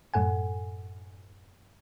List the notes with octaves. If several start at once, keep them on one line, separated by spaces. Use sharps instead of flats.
F#2 A2 A4 F#5 G#5